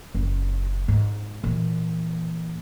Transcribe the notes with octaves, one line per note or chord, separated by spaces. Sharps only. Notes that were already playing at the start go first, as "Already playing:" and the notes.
F#1
G#2
A#2 E3